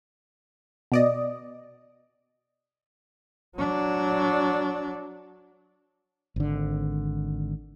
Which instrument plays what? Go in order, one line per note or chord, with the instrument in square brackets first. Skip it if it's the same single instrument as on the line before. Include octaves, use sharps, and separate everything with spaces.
[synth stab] B2 D5 D#5
[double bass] F#3 D4
[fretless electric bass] G#1 D3